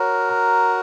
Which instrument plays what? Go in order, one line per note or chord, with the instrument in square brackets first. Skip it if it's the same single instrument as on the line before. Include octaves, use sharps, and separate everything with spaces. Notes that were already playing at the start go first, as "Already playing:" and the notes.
Already playing: [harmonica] F#4 A#4 [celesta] C#5
[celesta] A#5